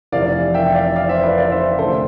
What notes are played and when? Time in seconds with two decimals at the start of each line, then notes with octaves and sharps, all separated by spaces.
0.12 F1 F2 C3 E3 D5 F5
0.54 E5 G5
0.74 D5 F5
0.96 D5 F5
1.09 C5 E5
1.23 B4 D5
1.38 D5 F5
1.52 C5 E5
1.79 D2 C3 E3 A4 C5